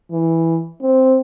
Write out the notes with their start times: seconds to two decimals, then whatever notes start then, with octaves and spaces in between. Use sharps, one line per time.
0.11 E3
0.82 C4